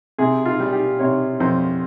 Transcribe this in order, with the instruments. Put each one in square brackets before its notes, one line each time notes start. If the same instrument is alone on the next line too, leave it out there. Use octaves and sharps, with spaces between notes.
[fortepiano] C3 G#4
F4
G3
G4
C3 C#5
F2 C5